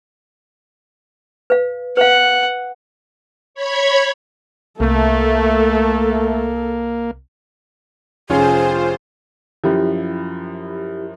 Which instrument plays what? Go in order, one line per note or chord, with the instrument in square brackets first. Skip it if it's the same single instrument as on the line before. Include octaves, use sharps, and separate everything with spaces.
[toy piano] B4 F5
[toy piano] B4 F5 [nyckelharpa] F#5
[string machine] C#5 B5 G#6
[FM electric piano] C2 [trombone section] A3 [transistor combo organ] A#3 [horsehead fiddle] A4
[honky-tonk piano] F1 C#4 [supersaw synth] F4 C5 [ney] G#4
[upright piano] F#2 F3 [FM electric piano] E4 G4 B5